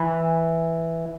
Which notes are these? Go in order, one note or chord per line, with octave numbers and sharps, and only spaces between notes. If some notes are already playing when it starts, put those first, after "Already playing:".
Already playing: E3